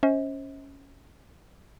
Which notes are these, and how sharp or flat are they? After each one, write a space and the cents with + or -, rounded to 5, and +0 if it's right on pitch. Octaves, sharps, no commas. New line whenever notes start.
C#4 +0 C5 +25 D#5 +45